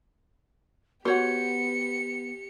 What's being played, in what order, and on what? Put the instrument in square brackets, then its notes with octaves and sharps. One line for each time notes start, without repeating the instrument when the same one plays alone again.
[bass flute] B3 [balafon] F#4 [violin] G4 C#7 [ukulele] C5 C#5 F#5